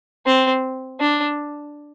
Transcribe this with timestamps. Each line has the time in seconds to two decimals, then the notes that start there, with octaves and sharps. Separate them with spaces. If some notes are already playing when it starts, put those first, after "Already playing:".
0.26 C4
1.00 D4